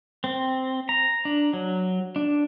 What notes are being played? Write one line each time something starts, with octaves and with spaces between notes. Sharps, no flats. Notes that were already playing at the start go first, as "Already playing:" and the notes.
C4
A#5
D4
F#3
D4